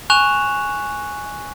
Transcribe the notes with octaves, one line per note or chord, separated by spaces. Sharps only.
G#5 C#6 F#6 E7 F7